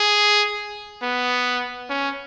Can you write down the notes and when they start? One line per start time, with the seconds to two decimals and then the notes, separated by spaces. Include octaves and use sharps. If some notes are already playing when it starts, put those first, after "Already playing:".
Already playing: G#4
1.02 B3
1.89 C#4